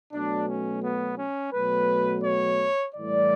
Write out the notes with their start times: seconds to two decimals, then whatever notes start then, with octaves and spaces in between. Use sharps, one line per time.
0.13 B2 F#3 A3 D4
0.48 C#4
0.83 B3
1.19 C#4
1.54 B2 F#3 A3 B4
2.24 C#5
2.95 A2 E3 G3 D5